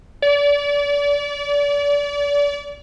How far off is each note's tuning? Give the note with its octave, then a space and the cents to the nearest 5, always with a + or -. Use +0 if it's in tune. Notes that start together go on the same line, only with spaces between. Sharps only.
D5 -35